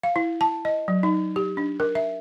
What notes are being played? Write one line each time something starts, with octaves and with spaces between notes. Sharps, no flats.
F5
E4
A5
D#5
F#3
D#4
G4
D4
A#4
E5